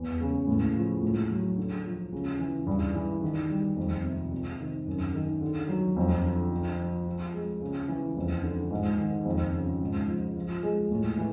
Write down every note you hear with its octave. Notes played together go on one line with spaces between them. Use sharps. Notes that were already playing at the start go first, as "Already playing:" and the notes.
Already playing: E2
C#3
A2
F3
A2
F#3
D3
F3
C#3
E3
G2
E3
D#3
G3
F2
C3
C3
D#3
F#2
D#3
D3
F#3
F2
D3
D3
F3
F3
G#3
C#3
E3
F2
D3
G#2
D#3
F2
C#3
G#2
F3
F3
G#3
A2
E3